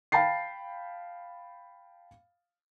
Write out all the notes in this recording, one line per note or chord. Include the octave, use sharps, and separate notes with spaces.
F5 G5 A5 B5 A6 C7